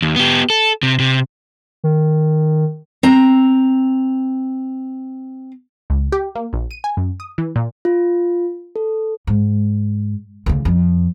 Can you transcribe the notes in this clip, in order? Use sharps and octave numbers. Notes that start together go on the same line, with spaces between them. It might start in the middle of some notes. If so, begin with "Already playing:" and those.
D#2
B3 G4
A4
C3
C3
D#3
C4 A#5
C#2
G4
A#3
A#1
D#7
G#5
F#2
D#6
E3
A#2
F4
A4
G#2
D2 C#3
F2